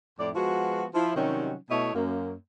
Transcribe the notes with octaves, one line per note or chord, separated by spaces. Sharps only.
F2 A2 E4 D5
F3 G#3 B3 F#4
F3 E4
C3 D#3 F#3 G3 C#4 D#4
B2 A3 E4 C#5 D#5 E5
F#2 A#3